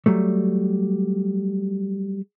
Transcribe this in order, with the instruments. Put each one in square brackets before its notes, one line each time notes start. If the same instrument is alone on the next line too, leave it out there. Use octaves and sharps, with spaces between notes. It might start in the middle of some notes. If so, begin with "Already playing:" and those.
[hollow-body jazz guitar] F#3 G3 A3